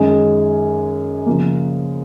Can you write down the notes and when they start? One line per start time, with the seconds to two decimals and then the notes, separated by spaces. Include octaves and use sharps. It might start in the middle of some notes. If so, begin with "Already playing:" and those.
Already playing: F#2 D#3 G#3
1.26 C#3 F3 A#3